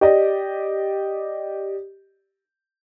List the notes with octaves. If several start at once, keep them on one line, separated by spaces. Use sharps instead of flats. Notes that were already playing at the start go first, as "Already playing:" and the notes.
G4 D5 D#5